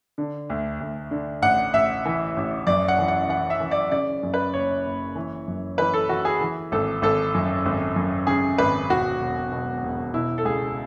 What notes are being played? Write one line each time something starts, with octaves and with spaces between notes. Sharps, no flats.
D3
D2
D2
D3
A1 F#5
A1 E5
E3
A1
F#2 D5
F#5
E3
F#5
E3 F#5
E5
E3
D5
C#3 D5
F#2
B4
F#1 C#5
F#1
E3
F#2
E3 B4
A4
E3 F#4
G#4
E3
G#1 A4
G#1 A4
F#2
G#1
F#2
C#3 G#4
G#1 B4
E1 F#4
E1
B2
E1
B2 E4
A4
C#2 G#4